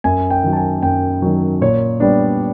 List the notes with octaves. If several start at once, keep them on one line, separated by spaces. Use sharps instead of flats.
F#2 G#5
G5
D#3 F#3
A5
G#5
F#2 G5
D#3 F#3
A#2 C#5
G3 B3 D4